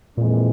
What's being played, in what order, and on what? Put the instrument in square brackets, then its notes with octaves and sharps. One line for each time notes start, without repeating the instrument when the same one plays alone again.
[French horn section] F2 E3 G#3 C4 [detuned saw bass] A#2